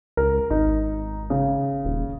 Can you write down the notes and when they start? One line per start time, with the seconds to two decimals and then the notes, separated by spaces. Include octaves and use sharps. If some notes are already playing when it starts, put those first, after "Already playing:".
0.17 C#2 A#4
0.50 G#1 D#4
1.30 C#3
1.85 D#1